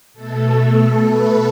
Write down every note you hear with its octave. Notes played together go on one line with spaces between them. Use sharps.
B2 A3 A4
B4